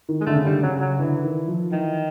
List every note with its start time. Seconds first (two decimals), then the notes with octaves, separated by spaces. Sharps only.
0.09 D#3
0.21 G#3
0.26 D3 A3
0.36 C#3
0.45 D3 G3
0.63 C#3 F#3
0.81 F#3
0.99 D3 E3
1.24 D#3
1.47 F3
1.72 D#3 E3